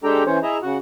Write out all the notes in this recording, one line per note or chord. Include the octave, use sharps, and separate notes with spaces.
G#3 D4 G4 A4 G5 A#5
E3 C#4 C5 C#5
E4 G#4 D#5 E5 A#5
C#3 F#4 F#5